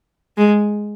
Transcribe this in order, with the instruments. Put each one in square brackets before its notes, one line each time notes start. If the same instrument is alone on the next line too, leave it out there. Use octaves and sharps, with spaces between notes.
[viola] G#3